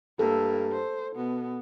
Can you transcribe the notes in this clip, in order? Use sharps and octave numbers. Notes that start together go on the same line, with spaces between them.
G2 A#3 A4
C5
B2 B3